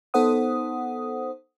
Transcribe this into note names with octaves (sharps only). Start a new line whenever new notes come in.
B3 D#4 A4 C5 F#5 D#6